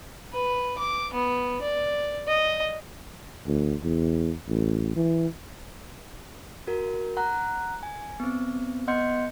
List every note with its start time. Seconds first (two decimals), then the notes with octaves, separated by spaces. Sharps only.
0.33 B4
0.79 D6
1.13 B3
1.62 D5
2.28 D#5
3.47 D2
3.82 E2
4.48 A1
4.96 E3
6.67 F#4 A#4
7.17 F#5 A#5 F#6
7.83 G#5
8.20 B3 C4
8.87 B3 D#5 F#5 C6 G6 C#7